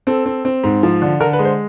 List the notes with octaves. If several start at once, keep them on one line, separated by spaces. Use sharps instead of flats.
C4 A4
C4
C4
G#2
F3
D3
D3 A#4
B4
G#3
C5